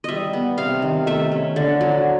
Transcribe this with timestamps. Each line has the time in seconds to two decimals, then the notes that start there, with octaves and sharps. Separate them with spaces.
0.04 G3 D#5 E5
0.33 B3
0.58 C3 F5
0.82 D#3
1.07 A3 E5
1.32 C#4
1.56 D3
1.81 F#3